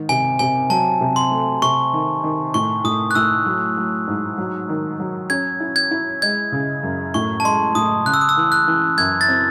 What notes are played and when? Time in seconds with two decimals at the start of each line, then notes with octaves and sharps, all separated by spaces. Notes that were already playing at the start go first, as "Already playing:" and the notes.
Already playing: G#2 D#3
0.09 C3 G#5
0.39 C3 G#5
0.70 F#3 A5
1.01 C3
1.16 C6
1.31 A3
1.62 C3 C#6
1.93 D#3
2.24 D#3
2.54 A2 C#6
2.84 A2 D#6
3.11 F#6
3.15 A2 E6
3.46 F#3
3.77 F#3
4.07 G#2
4.38 F#3
4.69 D#3
5.00 F#3
5.30 C#4 G#6
5.60 E4
5.76 G#6
5.91 E4
6.22 G#3 G#6
6.52 C#3
6.83 F#2
7.14 A2 C#6
7.40 A5
7.44 G#3 C6
7.75 A2 D#6
8.05 C#3 F#6
8.14 E6
8.21 D#6
8.29 E6
8.37 E3
8.52 F#6
8.68 E3
8.98 F#2 G#6
9.21 A6
9.29 C4